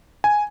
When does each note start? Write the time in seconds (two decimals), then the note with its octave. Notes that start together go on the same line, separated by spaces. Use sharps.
0.24 G#5